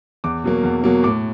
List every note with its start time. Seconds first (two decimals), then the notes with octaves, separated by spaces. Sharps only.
0.24 E2 D6
0.44 B2 F#3 A#3
0.63 E2
0.84 B2 F#3 A#3
1.03 A2 D6